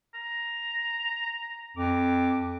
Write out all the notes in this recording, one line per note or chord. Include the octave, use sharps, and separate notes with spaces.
A#5
F2 D6